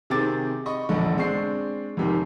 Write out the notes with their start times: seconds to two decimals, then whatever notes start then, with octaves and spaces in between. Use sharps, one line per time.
0.10 C3 D#3 C4 G#4 D6 A6
0.66 D#5 B5 C#6
0.89 E1 A#1 D3
1.17 G#3 C4 D4 C#6 C7
1.97 F1 C3 D#3